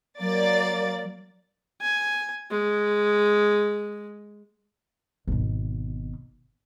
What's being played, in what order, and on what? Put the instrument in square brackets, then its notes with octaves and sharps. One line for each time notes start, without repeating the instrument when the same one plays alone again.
[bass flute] F#3 [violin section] A#3 D5 A6
[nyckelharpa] G#5
G#3
[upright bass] G#1 B2